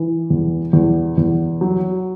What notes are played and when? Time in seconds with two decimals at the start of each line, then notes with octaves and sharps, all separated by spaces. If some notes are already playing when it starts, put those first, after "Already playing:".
Already playing: E3
0.30 E2
0.73 E2
1.18 E2
1.61 F#3